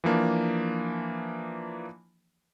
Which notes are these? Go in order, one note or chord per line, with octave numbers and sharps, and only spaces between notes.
E3 F3 A#3 D4